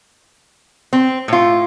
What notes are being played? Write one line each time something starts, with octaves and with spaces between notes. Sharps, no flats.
C4
A2 F4